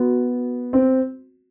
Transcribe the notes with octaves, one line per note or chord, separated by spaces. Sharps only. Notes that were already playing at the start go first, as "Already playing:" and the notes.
Already playing: B3 F#4
C4